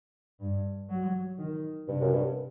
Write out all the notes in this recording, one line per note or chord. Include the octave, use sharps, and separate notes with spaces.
G2
F#3
D#3
G2 C3
F#2
G2